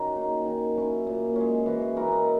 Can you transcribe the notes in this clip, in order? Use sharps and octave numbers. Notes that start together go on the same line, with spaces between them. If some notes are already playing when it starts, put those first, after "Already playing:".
Already playing: D#3 C#4 F#4 A#4 C#5
A#3 D#4 G#4
D#3
F#3 C#4 E4
A#2
G#3 C#4
E3 F#4
G#4
A#3 E4 F#4 A#4
D#5 F#5 G#5